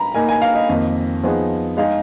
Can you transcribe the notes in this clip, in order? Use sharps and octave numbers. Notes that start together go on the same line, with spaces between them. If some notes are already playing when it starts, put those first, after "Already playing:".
Already playing: A#5 B5
A#3 D#4 A#4 G#5
G#5
F5
D#5
F2 D#3 A#3
F3 B3 D#4 G#4
G#3 D#4 G#4 F5